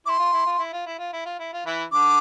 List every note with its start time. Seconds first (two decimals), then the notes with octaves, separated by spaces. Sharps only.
0.06 E4 C6 D6
0.19 F4
0.33 E4
0.46 F4
0.59 E4
0.73 F4
0.86 E4
0.99 F4
1.13 E4
1.26 F4
1.39 E4
1.53 F4
1.66 E3 E4
1.92 D3 D4 D6